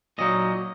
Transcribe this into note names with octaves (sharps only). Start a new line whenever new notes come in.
A#2 F#3 A#3 D#4 D#5